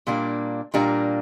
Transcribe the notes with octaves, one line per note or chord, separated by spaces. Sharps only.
A#2 G3 A#3 D4
A#2 G3 A#3 D4